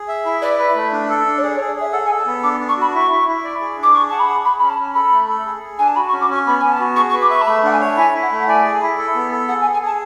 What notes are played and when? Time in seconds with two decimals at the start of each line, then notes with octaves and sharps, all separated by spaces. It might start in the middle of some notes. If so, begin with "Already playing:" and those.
Already playing: G#4
0.08 E5
0.25 E4
0.42 B4 D5
0.59 B4
0.76 A3
0.93 D4
1.09 A4
1.26 D4
1.38 C#5
1.42 G#4 D5
1.56 C#5
1.60 G#4
1.68 D5
1.76 G#4 E5
1.93 A4 F#5
2.06 G#5
2.10 A4
2.18 A5
2.26 B3
2.43 D4 D6
2.60 D4
2.69 C#6
2.77 F#4 B5
2.94 E4 C#6
3.11 E4
3.28 E4
3.45 D5
3.61 G#4
3.78 D4
3.83 D6
3.94 G#4 C#6
4.10 F#5 A5
4.20 B5
4.28 G#4
4.45 G#4 B5
4.59 C#4 B5
4.70 A5
4.79 C#4
4.95 A4 B5
5.12 A3
5.28 A4
5.46 G#4
5.63 G#4
5.79 D4 G#5
5.88 A5
5.96 F#4 B5
6.08 C#6
6.12 C#4
6.21 D6
6.29 C#4 C#6
6.47 B3 B5
6.60 B3 G#5
6.72 A5
6.80 F#4
6.96 G#4 C#6
7.10 C#6
7.13 B4
7.22 D6
7.30 E5 C#6
7.41 A5
7.47 A3 B5
7.64 D4 F#5
7.72 G#5
7.80 C#5 E5
7.97 E4 G#5
8.14 E4
8.22 F#5
8.32 A3
8.43 F#5
8.48 D5 G#5
8.64 G#4
8.82 E4
8.98 A4
9.15 B3
9.32 A4
9.48 G#4 F#5
9.61 G#5
9.65 G#4
9.73 G#5
9.82 G#4 A5